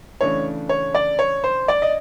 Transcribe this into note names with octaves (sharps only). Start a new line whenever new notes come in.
C#3 E3 A3 D4 C#5
C#5
D5
C#5
C5
D5
D#5